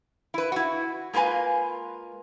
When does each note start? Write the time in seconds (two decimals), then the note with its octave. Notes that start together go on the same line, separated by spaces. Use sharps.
0.34 E4 B4
0.52 E4 F#4
1.13 G#3 A#3 F4 B4 G#5